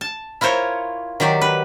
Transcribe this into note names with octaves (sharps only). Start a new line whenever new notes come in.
A5
E4 F4 A#4 C5 C#5
D#3 F#3 G4 D5
B4